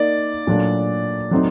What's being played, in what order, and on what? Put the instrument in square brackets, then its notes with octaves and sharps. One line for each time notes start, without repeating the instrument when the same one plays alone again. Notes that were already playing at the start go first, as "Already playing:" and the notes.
Already playing: [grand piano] A#3 D#4 [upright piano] D5
[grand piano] A#2 F#3 A3 D4
F#3 A3 C4 D#4